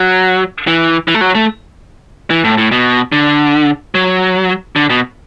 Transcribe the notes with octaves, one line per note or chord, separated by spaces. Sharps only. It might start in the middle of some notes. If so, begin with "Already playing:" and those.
Already playing: F#3
E3
E3
A3
F#3
A3
E3
A2
A2
B2
D3
F#3
D3
B2